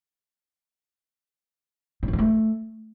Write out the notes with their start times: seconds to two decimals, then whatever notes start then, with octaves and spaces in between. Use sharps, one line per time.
2.03 A2
2.08 B2
2.13 D3
2.19 A3